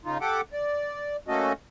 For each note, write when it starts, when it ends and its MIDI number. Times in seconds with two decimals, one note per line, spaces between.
0.05 0.18 49
0.05 0.18 63
0.05 0.18 65
0.21 0.41 67
0.21 0.41 69
0.21 0.41 78
0.21 0.41 86
0.53 1.17 74
1.28 1.53 57
1.28 1.53 58
1.28 1.53 61
1.28 1.53 66
1.28 1.53 69
1.28 1.53 75